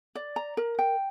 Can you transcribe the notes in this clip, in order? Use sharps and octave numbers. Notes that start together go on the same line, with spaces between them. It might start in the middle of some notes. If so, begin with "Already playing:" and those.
D5
A#5
A#4
G5